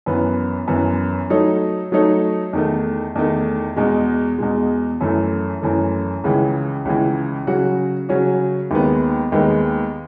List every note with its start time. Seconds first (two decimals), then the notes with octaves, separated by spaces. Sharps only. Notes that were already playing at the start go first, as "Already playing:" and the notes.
0.06 F#2 E3 B3
0.68 F#2 E3 B3
1.30 F#3 A3 D#4 A4 C#5
1.92 F#3 A3 D#4 A4 C#5
2.53 E2 D#3 A3
3.15 E2 D#3 A3
3.76 E2 B2 G#3
4.38 E2 B2 G#3
5.01 F#2 E3 A3
5.62 F#2 E3 A3
6.24 C#2 C#3 E3
6.85 C#2 C#3 E3
7.47 C#3 F#3 C#4 F#4
8.09 C#3 F#3 C#4 F#4
8.71 D#2 D#3 G#3 B3
9.32 D#2 D#3 G#3 B3